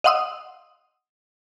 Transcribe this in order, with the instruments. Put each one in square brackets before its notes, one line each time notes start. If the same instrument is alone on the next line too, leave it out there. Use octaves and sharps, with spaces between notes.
[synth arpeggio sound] D#5 F5 F#5 C6 D#6 E6